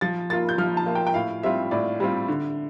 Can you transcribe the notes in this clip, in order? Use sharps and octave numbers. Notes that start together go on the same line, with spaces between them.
F3 A6
A#3 F4 A6
G6
F3 F6
A5
A#3 F4
G5
G5
A2 F5
G3 C4 F4 E5
A2 D5
G3 C4 F4
D3